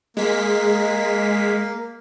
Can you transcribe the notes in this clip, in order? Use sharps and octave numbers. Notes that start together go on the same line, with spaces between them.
G#3 A#3 B6